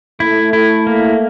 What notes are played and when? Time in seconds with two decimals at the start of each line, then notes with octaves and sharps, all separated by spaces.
0.20 A3 E4
0.53 E4
0.87 A#3